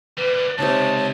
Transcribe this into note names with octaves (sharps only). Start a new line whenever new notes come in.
G3 A#3 B4
C#2 C3 D#4 C#5 F#5 A5